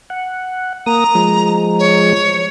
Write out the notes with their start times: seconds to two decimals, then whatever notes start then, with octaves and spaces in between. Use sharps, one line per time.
0.10 F#5
0.86 A#3 A#5 D#6
1.15 F3 G#3
1.79 C#5